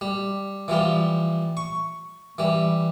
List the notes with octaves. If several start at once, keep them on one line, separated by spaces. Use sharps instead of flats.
G3
E3 F3 G3 F4
C#6
E3 G3